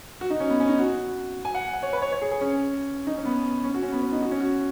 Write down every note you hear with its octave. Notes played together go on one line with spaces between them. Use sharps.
F#4
D#4
C#4
B3
C#4
D#4
F#4
G#5
F#5
F#5
C#5
B4
C#5
C#5
G#4
G#4
C#4
D#4
C#4
B3
C#4
F#4
C#4
B3
C#4
D#4
F#4
C#4
F#4